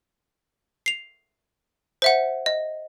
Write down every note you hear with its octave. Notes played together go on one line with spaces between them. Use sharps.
C7 F7
C5 E5 F#5
D#5